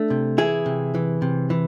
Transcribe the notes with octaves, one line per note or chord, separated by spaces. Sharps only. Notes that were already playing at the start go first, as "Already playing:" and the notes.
Already playing: A3 D4
C3
E3 E4 G#4
C3
E3
C3
E3